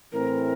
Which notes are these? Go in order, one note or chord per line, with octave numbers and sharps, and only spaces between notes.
A2 E3 A3 C4 E4 A#4